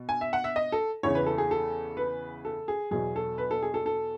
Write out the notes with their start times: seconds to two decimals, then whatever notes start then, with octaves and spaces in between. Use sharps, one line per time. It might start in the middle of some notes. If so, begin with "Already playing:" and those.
Already playing: B2
0.09 G#5
0.21 E5
0.33 F#5
0.44 E5
0.56 D#5
0.72 A4
1.03 E2 C#3 E3 C#5
1.15 B4
1.26 A4
1.38 G#4
1.51 A4
1.97 B4
2.45 A4
2.68 G#4
2.91 E2 B2 F#3 G#4
3.16 A4
3.38 B4
3.51 A4
3.62 G#4
3.74 A4
3.86 A4